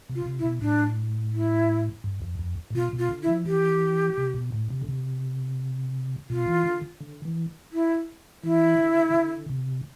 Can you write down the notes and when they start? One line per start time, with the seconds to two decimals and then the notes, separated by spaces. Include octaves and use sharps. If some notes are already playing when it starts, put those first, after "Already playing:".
0.09 C3
0.15 F4
0.26 C3
0.39 E4
0.44 B2
0.61 A2 D4
1.34 E4
2.04 G2
2.22 F2
2.39 F2
2.70 A2
2.75 B2 F4
2.93 B2
2.99 F4
3.11 D3
3.22 E4
3.29 F3
3.46 E3 G4
4.18 C3
4.35 B2
4.52 A2
4.70 C3
4.81 D3
4.88 C3
6.30 B2 F4
6.47 E3
6.65 D3
7.01 D3
7.25 E3
7.72 E4
8.43 E3 E4
8.78 D3
9.14 D3
9.49 C3